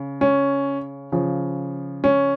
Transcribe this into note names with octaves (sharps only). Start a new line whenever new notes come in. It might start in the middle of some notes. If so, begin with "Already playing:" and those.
Already playing: C#3
C#4
C#3 F3
C#4